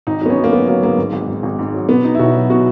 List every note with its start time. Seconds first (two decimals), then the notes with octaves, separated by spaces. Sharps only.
0.07 G#1 D#4
0.21 F#3 B3
0.30 C#4
0.37 F#3
0.44 A#3
0.52 F#3 B3
0.68 F#3 A#3
0.82 G#2 A#3
0.98 G#2
1.13 G#1
1.28 G#2
1.43 G#1
1.59 G#2
1.74 F#3
1.89 B2 B3
2.04 B2 D#4
2.15 E4
2.19 B1 F#4
2.34 F#3
2.50 B2 F#4